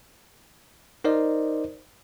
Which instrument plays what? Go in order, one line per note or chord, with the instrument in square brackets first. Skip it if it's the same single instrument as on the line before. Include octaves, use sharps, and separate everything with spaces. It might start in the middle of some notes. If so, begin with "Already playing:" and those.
[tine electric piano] D#4 A#4 C5 D5 D#5